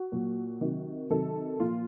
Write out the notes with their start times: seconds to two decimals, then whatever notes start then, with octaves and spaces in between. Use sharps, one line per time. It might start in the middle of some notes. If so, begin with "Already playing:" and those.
Already playing: F#4
0.12 A#2 F#3
0.61 C3 D#3 F#3
1.10 C3 D#3 F#3 A4
1.59 A#2 F3 F4